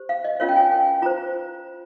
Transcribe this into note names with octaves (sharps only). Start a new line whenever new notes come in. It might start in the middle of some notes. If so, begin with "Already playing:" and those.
Already playing: G4 C5
F5
D#5
C#4 F4 A#4 C#5 F5
G5
G#5
G5
F4 C5 A#5